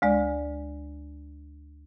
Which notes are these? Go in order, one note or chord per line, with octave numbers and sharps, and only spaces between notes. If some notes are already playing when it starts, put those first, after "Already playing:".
D2 G#3 D5